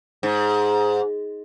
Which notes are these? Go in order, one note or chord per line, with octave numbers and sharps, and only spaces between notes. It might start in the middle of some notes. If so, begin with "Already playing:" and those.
G#2